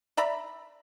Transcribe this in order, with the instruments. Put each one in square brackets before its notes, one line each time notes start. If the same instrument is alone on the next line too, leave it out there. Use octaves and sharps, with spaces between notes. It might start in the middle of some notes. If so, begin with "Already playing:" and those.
[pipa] D5 E5 A#5 B5